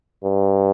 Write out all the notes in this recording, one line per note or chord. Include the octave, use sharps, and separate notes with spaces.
G2